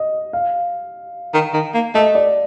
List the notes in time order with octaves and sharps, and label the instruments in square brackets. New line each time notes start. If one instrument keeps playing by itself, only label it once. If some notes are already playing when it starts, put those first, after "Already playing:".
Already playing: [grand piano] D#5
F5
[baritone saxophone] D#3
D#3
A#3
[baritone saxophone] A3 [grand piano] D#5
[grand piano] D5